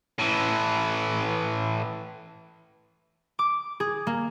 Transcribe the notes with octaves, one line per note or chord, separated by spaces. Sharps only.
A2 E3
D6
G#4
A#3